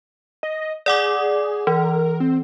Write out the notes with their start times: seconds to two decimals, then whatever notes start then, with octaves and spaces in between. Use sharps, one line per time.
0.43 D#5
0.86 G#4 D5 F#5 D6
1.67 E3 A#4
2.20 C4